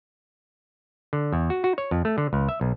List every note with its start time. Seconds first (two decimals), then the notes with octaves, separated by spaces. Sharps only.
1.13 D3
1.33 E2
1.50 F#4
1.64 F#4
1.78 C#5
1.91 F2
2.05 A3
2.18 D3
2.33 C#2
2.49 E5
2.61 B1